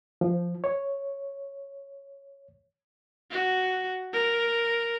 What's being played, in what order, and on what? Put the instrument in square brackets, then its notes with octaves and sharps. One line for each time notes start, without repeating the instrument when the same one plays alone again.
[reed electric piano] F3
C#5
[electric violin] F#4
A#4